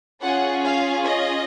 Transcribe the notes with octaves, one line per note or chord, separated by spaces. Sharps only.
C#4 F4 G#4 F#5
F5
D#5